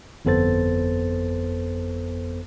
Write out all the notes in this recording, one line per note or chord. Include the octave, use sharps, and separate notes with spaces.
G1 F2 B3 A4 C5 A6